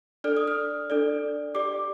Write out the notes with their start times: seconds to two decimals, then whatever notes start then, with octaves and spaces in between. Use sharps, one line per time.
0.24 D4 A4 D5 F6
0.37 D#6
0.47 F6
0.90 D4 A4 D5
1.55 G4 D5 D6